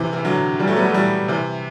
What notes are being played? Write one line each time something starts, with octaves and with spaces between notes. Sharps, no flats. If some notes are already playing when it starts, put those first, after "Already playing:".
Already playing: C3 E3
E3
D3 F#3
E3 G3
F#3 A3
G3 B3
F#3 A3
E3 G3
C3 E3